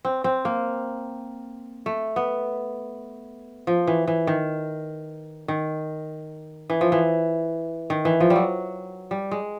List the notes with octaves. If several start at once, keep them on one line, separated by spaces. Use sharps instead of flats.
C4
C4
A#3
A3
B3
F3
E3
E3
D#3
D#3
E3
F3
E3
D#3
E3
F3
G3
F#3
G3
G#3